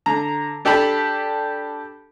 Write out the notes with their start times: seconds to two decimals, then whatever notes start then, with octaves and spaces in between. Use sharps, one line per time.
0.06 D3 A#5
0.65 D4 G4 A4 A5 B5